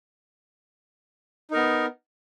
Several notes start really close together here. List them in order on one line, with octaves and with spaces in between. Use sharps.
D#4 A#4 B3